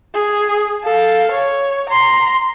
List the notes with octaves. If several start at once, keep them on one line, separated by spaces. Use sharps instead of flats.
G#4
A4 F5
C#5
A#5 C6